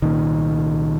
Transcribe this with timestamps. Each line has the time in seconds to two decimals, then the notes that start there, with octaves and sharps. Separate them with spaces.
0.02 C2 A#2 D#3